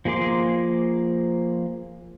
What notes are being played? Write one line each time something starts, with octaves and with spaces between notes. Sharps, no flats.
F3 A#3 G#4 C6 D6